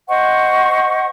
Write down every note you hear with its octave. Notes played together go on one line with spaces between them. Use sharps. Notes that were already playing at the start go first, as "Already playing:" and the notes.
C5 D#5 F#5 C#6